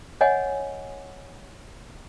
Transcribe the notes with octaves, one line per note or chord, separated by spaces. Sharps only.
C#5 D#5 F#5 G#5